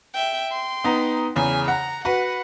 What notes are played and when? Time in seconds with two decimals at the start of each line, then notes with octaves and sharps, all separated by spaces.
0.14 E5 G5
0.51 G5 C6
0.84 B3 D#4 A#5
1.36 E2 C#3 G#5
1.68 F#5 A#5
2.05 F#4 B4 F#5